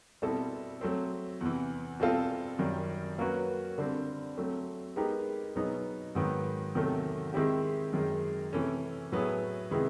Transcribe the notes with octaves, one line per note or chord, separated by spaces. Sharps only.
B2 G3 C4 E4 A4
F#3 A3 C4
E2 C3 E3
B2 G3 C4 F4 A4
F#2 D#3 G3
F#3 A#3 C#4 F#4 B4
D3 G3 C4
F#3 A3 C4
G#3 B3 D#4 G4 A#4
B2 F#3 B3 D#4 G#4
G#2 D#3 F#3 B3
E2 C3 D#3 F#3 A3
D#3 G#3 C4 E4 G4
F#2 D#3 G#3
C3 E3 A3 C#4
A2 F#3 B3 E4 G#4
C3 D#3 G#3 B3 E4